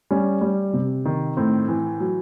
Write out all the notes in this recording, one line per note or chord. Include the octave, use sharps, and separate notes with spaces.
G3 C#4
G3
C3
D#3
A2 C4
E3
F#3